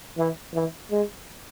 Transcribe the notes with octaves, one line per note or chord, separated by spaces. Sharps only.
E3
E3
G#3